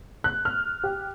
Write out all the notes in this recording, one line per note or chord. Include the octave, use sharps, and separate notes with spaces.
F#6
F6
G4